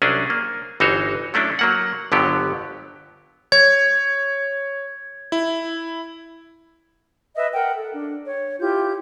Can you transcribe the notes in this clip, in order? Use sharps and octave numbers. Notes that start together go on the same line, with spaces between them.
C2 F#3 C#4 D4 G#4
A#3
G1 E3 D#4 F#4 C5 C#5
F#3 A3 C#4 D4 E4
F#3 A#3 F#5
G1 F2 D3 F#3 B3 G4
C#5 G#6
E4
B4 D#5 E5
A#4 F#5 G5
A4
D4
C#5
E4 F4 G4 G6